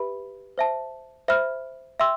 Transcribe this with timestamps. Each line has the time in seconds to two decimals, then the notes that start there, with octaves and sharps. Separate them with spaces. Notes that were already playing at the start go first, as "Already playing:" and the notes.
Already playing: G4 B4 E5 B5
0.58 C5 E5 A5
1.28 C5 E5 B5 F6
2.00 E5 G5 C6 E6